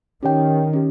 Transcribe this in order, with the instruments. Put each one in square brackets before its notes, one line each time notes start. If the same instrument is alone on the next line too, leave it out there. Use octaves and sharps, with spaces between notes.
[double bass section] D#3 [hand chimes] C#4 G4 C#5 G5
[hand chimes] C#4 G4